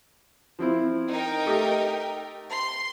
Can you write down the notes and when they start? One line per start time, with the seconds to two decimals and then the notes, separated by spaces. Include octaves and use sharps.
0.59 F3 C4 E4
1.10 D#4 A#4 G5
1.46 A3 G4 D#5
2.52 C6